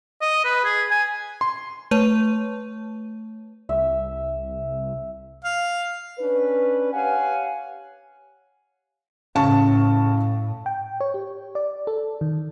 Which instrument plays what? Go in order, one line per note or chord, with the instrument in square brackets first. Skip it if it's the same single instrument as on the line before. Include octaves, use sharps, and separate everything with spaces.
[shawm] D#5
B4
G#4
G#5
[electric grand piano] C6
[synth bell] A3 B4 C#5 A5 D#7
[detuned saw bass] C2 [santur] E5
[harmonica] F5
[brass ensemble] C#4 D4 B4
G4 C#5 F5 F#5 G#5
[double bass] A2 [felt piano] C#3 A5 C#6
[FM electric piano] G5
C#5
G4
D5
A4
D#3